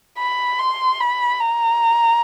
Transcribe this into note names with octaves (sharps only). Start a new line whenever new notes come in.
B5
C6
B5
A#5